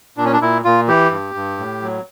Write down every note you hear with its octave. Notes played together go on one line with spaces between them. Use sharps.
A#2 D4
C#4
D4
A#2 E4
A#2 F4
E3 G4
G2
G2
A2
F#3